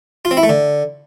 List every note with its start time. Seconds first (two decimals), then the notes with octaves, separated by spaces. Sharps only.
0.25 F4
0.31 C4
0.37 E4
0.43 A3
0.49 D3